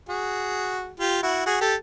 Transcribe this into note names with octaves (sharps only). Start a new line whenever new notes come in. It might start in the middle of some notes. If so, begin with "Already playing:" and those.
F#4 G#4
F4 G4
E4 F#4
F#4 G#4
G4 A4